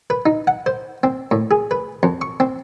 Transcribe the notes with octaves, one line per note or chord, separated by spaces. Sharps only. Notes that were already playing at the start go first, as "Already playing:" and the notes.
B4
D#4
F#5
C5
C4
A2
G#4
B4
F2
C#6
C4